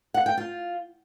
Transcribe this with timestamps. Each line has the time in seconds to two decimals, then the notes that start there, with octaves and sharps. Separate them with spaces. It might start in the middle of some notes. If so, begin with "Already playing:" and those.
0.14 F#5
0.26 G5
0.37 F4